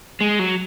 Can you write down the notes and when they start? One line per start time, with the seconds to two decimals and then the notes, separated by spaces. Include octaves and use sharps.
0.21 G#3
0.39 F#3